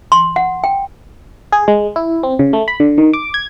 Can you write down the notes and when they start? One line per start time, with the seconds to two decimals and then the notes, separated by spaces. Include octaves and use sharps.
0.12 C6
0.36 F#5
0.64 G5
1.52 G#4
1.68 G#3
1.96 E4
2.23 C4
2.39 C#3
2.53 A3
2.68 B5
2.80 D3
2.98 D#3
3.13 D6
3.34 G#6